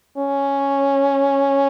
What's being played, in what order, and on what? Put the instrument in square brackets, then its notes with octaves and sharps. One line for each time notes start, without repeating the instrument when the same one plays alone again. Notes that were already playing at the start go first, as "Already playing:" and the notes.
[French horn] C#4